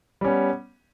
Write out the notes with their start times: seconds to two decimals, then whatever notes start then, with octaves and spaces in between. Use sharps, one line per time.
0.21 G3
0.24 C#4
0.28 B3